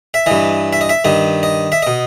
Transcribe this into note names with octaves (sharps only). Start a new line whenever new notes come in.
E5
G2 E3 D#5
E5
D#5
E5
G2 D#3 D#5
D#5
E5
B2 D#5